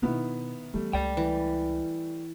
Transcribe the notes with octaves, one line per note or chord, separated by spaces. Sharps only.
B2 D#3 B3 E4
E3 G3 A3 B3
C#2 D5 G5
E3